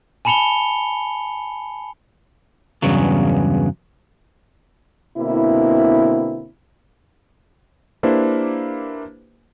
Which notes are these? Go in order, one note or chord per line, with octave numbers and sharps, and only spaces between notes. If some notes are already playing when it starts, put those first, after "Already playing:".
G#5 A5 B5 C#7 F7 G7
E2 G2 C#3 F#3
B2 D3 A#3 C4 E4
A#3 D4 E4 G4 B4 C5